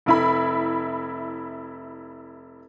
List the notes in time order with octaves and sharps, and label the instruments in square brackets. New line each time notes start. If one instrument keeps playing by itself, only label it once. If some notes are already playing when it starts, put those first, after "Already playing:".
[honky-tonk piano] F1 E4 B5